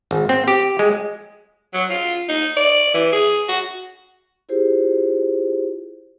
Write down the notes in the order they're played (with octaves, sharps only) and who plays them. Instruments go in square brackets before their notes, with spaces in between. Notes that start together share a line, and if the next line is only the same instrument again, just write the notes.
[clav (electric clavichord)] G#1
C4
G4
G#3
[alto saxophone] F#3
F4
D#4
D5
E3
G#4
F#4
[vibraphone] E4 F4 G4 G#4 C5